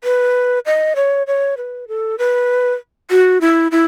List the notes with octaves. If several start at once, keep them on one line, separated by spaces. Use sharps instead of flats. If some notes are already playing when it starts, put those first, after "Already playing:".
B4
D#5
C#5
C#5
B4
A4
B4
F#4
E4
E4